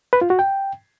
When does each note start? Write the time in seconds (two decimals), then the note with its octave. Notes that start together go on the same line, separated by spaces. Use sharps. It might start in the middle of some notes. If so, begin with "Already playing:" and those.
0.13 B4
0.21 F4
0.30 F#4
0.39 G5